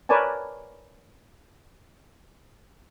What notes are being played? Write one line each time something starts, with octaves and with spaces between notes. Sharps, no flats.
A#4 B4 C#5 D5 G#5 A5